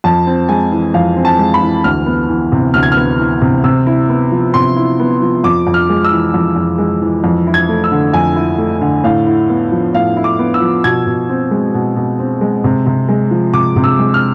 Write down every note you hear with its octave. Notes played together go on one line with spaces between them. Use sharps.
F2 A5
C4
G#3 G#5
E3
F2 F5
C4
A5
G#3
B5
E3
D2 F6
B3
E3
C3
D2 F6
G#6
B3 F6
E3
C3
C3 E6
E4
B3
F3
C3 C6
E4
B3
F3
F2 D6
F2
F6
G#3
E6
E3
F2
F2
G#3
E3
F2
E4
G#6
A3
E6
D3
F2 G#5
E4
A3
D3
A2 F5
E4
B3
F3
A2 F5
E4
D6
B3
E6
F3
B2 G#6
B2
C4
G#3
B2
B2
C4
G#3
C3
C3
G#3
F3
C3 D6
C3
E6
G#3
F6